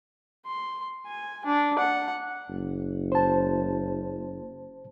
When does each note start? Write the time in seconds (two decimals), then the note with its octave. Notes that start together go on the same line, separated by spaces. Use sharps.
0.47 C6
1.07 G#5
1.46 D4
1.79 F#5
2.49 F#1
3.12 C5 A5